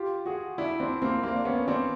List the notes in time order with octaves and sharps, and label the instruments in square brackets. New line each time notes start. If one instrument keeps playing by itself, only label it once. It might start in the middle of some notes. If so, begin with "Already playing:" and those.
Already playing: [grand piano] F4 G4
F#4 G#4
D4 E4
C4 D4
A#3 C4
A#3 C4
D4
B3 C#4
C4 D4